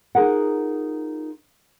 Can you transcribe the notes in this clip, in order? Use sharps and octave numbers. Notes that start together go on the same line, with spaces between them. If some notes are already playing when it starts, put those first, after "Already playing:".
D#4 F4 G#4 A#4 F#5